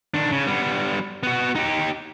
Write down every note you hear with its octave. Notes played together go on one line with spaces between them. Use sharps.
D#3 D4
C#3
G3 B3
B3 F#4
D#4 G4